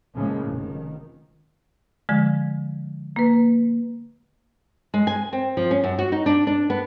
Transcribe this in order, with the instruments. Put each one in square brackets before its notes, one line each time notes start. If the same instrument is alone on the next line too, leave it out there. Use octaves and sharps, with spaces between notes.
[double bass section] A2 C#3 F3 G#3 A#3
F1 D#3
[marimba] D3 F3 G#3
A#3 B4
[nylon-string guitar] G#3
G#5
C4
F3
C#4
F#2
F#4
D#4
D4
D4
B3